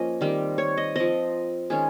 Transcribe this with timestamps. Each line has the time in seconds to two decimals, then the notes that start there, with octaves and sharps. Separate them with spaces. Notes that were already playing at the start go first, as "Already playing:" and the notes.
Already playing: F3 A#3 C#4 D#5
0.21 D#3 G3 C4
0.58 C#5
0.77 D#5
0.95 F3 C4 D#5
1.70 D#3 G#3 C#4 G#4